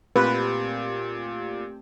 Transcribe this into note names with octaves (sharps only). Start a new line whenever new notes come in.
A#2 A3 C4 G4 B4